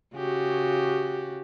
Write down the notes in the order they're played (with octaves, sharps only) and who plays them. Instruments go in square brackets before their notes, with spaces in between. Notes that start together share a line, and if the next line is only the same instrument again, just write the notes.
[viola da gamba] C#3 F#4 G4